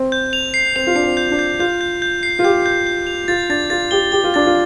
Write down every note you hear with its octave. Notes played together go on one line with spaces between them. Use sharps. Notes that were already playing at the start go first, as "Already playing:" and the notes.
Already playing: C4
G6
F7
C7
C4 F7
F4
D4 C7
C4
G6
D4
G6
F4 G6
G6
G6
C7
F4
G4 G6
G6
G6
F7
F4 A6
D4 A6
F4 A6
G4 G7
G4 G7
F4
D4 A6
F4